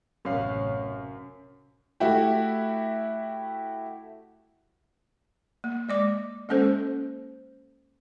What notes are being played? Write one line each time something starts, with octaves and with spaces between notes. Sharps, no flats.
A1 F#2 C3 C#5 F5 F#6
A3 E4 F#4 G4
A#3
G#3 D5 D6
G#3 A#3 C#4 A4 C5